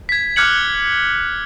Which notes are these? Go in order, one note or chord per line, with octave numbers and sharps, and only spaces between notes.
G#6 B6
D6 F6 F#6 G#6 C#7 F#7